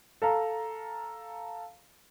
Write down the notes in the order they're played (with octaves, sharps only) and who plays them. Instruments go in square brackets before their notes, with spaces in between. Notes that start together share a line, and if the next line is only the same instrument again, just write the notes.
[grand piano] A4 F5 A#5